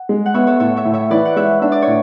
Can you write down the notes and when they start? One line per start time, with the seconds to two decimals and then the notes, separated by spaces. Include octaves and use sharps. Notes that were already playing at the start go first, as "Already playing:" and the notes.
Already playing: F#5
0.09 G#3
0.26 F#5
0.34 B3 C#5 E5
0.47 A4 C#5
0.60 A2 A4 C#5
0.77 C#5 E5
0.85 A2
0.93 C#5 E5
1.11 E3 B4 D5
1.25 F#5
1.36 G#3 C#5 E5
1.62 D4 E5
1.72 D5
1.82 A2 C#5